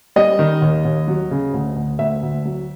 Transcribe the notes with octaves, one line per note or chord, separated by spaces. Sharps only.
G3 D#5
D#3
D#2
D#2
F#3
C#3
D2
D2
D2 E5
D2
F#3